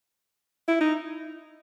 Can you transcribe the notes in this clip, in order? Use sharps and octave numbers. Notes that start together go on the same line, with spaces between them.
E4
D#4